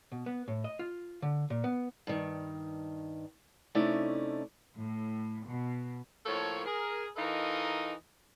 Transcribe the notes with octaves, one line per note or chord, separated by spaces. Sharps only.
B2
B3
A2
D#5
F4
D3
A#2
B3
G2 D#3
C3 A3 C#4 D#4 E4 D5
A2
B2
A2 F3 A#3 A4 C#5
G#4 A#4
E3 D#4 F4 A4 A#4 D#5